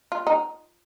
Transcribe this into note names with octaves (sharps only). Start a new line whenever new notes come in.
F4
D#4